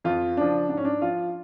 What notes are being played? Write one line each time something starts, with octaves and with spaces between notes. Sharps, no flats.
F2 F4
C#3 F3 D4
G#2 D4
C#4
D4
F3 F4